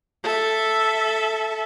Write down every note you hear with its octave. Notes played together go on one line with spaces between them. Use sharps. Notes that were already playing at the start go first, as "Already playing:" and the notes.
A4 E5